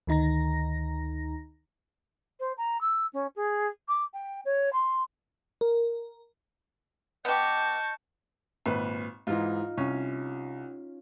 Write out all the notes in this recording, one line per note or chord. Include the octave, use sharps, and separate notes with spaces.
D2 D#3 D#4 A#5 A#6
C5
A#5
E6
C#4
G#4
D6
G5
C#5
C6
A#4
B3 G4 D#5 A5 C#6 F6 G6
G#1 A#2 B4
G#2 E3 D#4 F4
C2 C#4